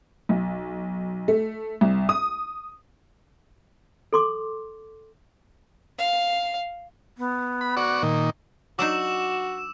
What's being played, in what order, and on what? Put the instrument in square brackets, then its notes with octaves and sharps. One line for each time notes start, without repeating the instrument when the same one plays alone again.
[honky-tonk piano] B1
A3
C2
D#6
[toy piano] A4 C6 D6
[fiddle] F5
[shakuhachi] B3
[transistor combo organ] B5
F#4 D5 C#6
A#2 D#3
[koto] F#3 D4 D#4 [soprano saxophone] F#4 [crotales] D6 E6 E7